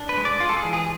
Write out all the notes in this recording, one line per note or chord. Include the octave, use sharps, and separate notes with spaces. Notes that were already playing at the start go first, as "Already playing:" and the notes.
Already playing: D4
B4
G#3
D5
G#3 F4
A4
G#4
E3
G#4